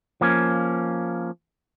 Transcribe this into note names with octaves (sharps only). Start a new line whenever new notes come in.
F3 A#3 C#4